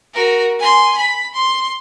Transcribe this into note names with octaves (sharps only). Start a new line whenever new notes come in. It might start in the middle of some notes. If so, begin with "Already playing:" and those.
F#4 A#4
G#5 C6
B5
C6